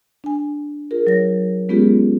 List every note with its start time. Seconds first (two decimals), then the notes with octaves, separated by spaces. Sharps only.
0.24 D4 G#5
0.91 F4 G#4 A#4
1.07 F#3 C#5 A#6
1.69 G#3 B3 C#4 F4 G4 G#4